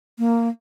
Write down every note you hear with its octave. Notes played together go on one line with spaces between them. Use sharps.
A#3